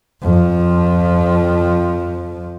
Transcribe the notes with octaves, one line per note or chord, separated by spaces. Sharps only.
F2 F3